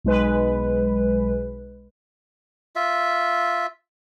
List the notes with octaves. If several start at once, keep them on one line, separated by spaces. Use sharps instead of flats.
B1 G#3 B4
F4 E5